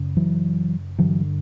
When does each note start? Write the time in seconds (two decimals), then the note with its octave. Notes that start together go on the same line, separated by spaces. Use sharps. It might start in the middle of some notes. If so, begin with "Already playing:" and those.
Already playing: F#2 C#3
0.17 E3 F#3
0.99 G2 D3 E3 F#3